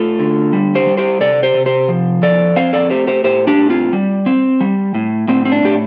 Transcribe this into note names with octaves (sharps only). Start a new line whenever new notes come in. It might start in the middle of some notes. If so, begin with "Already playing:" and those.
Already playing: A3 F4 A4
D3
G3
G4 C5
G3
G4 C5
C3 A4 D5
G4 C5
C3
G4 C5
F3
F2 A4 D5
C4 C5 F5
A4 D5
A3 G4 C5
G4 C5
A2 G4 C5
D4 G4
A2
C4 F4
G3
C4
G3
A2
A2 C4
C4
D4
A2 G4